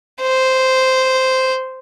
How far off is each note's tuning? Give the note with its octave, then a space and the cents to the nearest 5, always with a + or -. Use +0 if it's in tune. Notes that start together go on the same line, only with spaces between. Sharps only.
C5 -5